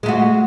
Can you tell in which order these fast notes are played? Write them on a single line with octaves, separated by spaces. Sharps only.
G#3 A3 F#4